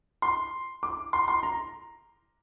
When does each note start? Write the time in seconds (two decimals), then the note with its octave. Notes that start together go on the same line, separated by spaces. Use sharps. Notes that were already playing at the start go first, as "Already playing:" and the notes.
0.22 C6
0.83 D6
1.13 C6
1.28 C6
1.43 A#5